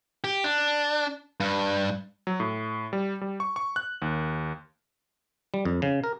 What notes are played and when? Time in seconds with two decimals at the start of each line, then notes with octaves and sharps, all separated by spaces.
0.24 G4
0.44 D4
1.40 G2
2.27 F#3
2.40 A2
2.93 G3
3.21 G3
3.40 C#6
3.56 C#6
3.76 F#6
4.02 D#2
5.54 G3
5.65 F2
5.82 C#3
6.04 A#4